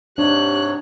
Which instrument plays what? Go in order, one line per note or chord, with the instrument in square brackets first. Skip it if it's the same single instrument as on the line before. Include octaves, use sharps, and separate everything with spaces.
[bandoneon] G#2 C3 C#5 [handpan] D4 [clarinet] G4 [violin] F#6